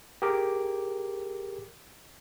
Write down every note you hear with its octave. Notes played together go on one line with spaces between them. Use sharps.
G4 G#4 A#4 D6